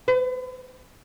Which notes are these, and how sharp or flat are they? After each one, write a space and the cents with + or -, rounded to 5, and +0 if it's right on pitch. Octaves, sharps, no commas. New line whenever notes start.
B4 +40